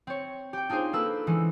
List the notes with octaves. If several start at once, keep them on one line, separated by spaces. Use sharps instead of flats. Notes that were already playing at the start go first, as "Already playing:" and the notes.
C4 C#5
G4 G5
D4 D#4 F4 G#4 C5
A#3 A4 B4 E6
E3 G#3 C#4